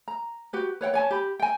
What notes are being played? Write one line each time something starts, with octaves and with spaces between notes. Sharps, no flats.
A#5
F#4 G4 B4
B4 C#5 F#5 G5
C#5 G#5 A5
G4 B5
G5 G#5